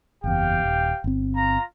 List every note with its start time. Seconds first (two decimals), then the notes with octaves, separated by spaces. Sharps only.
0.24 F#1 E2 G4 F5 G5
0.63 D#1
1.04 G1 C4
1.36 F4 A#5